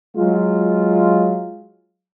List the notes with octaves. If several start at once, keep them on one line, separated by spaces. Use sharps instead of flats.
F#3 G#3 F4